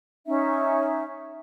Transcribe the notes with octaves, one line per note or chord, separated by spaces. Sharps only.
C#4 D#4 E5